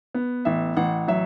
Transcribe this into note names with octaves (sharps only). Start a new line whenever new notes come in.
B3
A1 E5
A1 F#5
F#3 E5